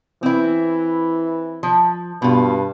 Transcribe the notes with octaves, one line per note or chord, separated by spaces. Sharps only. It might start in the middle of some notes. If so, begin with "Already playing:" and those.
E3 C4 E4
F3
G2 B2 F4